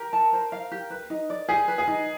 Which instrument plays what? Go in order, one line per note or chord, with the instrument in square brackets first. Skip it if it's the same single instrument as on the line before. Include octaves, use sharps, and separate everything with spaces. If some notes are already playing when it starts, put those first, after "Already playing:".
Already playing: [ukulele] G4 [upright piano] A#4
[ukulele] A5
C5
F5
G4
B4
D#4
D5
[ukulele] G4 [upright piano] G#4
[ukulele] B4
[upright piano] G#4
[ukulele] D#4